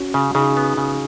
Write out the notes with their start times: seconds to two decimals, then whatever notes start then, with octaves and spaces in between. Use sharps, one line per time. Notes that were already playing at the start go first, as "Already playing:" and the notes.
Already playing: C#4 F#4
0.14 C#3
0.35 C#3 D#4 G#4
0.57 B3
0.77 C#3